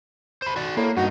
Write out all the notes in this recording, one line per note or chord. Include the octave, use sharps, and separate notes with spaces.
C5 B5
F#4 D5
A2 A#3
G2 D#4 F#4